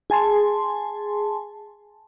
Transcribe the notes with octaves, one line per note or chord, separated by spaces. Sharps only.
G#4 G#5 A5 C6